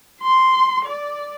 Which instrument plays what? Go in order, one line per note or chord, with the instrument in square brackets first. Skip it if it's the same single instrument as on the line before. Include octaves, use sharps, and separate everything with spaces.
[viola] C6
D5